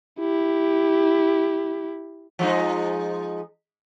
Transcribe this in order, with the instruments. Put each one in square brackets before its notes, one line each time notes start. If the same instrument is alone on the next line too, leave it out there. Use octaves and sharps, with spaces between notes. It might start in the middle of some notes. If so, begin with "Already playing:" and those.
[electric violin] E4 G4
[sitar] F3 G#3 D#4